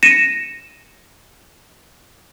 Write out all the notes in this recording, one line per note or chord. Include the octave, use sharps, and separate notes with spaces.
A#6 C#7 D#7 E7